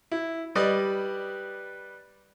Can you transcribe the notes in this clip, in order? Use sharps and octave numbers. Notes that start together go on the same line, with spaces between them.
E4
G3 B4 D5 D#5